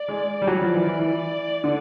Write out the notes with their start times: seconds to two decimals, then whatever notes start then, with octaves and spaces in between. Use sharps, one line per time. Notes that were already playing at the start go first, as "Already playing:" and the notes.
Already playing: D5
0.08 G#3
0.42 G3
0.47 F#3
0.61 F3 D5
0.74 E3
0.87 E3
0.99 E3
1.64 D3